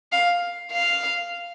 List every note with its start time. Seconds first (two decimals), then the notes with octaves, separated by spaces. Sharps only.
0.12 F5
0.72 F5